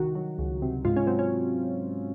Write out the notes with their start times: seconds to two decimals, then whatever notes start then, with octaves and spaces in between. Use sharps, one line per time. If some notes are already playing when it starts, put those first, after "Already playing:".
Already playing: C2 D#3 F#4
0.15 F#3
0.39 C#2
0.62 C3
0.85 G#2 F4
0.96 C#4
1.07 F#3 C4
1.19 C#4